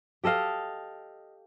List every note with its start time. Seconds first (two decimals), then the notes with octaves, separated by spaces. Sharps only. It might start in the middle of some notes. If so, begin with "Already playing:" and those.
0.24 G4 A4 D#5 F5